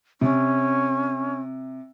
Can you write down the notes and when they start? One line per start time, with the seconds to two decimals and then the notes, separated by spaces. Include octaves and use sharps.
0.21 C3 C#4